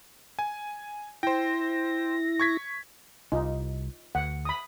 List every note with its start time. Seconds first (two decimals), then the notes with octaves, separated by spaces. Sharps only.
0.39 G#5
1.23 E4 C5 G5 A#6
2.40 C#6 G#6 B6
3.32 C2 D#4 F4
4.15 D2 F#5
4.45 B5 D#6